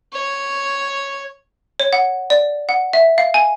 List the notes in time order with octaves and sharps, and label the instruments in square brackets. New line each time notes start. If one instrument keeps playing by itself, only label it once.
[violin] C#5
[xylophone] C#5
F#5
D5
F#5
E5
F5
G#5